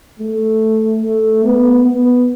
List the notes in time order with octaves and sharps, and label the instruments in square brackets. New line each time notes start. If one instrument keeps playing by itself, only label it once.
[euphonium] A3
A3
B3
B3